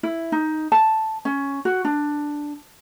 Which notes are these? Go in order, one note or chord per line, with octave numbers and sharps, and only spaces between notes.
E4
D#4
A5
C#4
F#4
D4